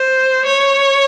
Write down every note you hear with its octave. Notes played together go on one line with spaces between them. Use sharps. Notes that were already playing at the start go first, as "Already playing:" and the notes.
Already playing: C5
C#5